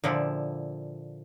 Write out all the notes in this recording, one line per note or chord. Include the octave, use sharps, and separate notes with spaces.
A#2 D3 F3 E4